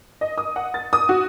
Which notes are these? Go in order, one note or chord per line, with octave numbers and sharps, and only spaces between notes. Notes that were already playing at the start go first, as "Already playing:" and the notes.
D#5
D#6
F#5
A6
D#6
F#4